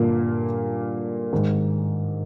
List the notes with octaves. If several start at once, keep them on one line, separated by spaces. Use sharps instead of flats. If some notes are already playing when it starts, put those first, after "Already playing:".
Already playing: G2 A#2 D3 A#3
G#2 D#3